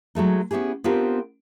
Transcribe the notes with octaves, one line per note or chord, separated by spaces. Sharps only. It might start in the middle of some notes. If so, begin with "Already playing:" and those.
F#3 G#3 A3 D#4
B3 C#4 E4 G4 G#4
B3 C4 D4 F4 G4 A#4